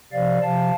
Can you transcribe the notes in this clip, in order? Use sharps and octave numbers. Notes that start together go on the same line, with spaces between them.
C3 F3 D5 F5
C3 F3 F5 A5